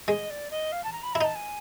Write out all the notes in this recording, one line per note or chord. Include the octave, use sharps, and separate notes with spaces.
G#3 D#5
D5
D#5
F5
A5
A#5
B5
E4 A#5
D#4 A5
G#5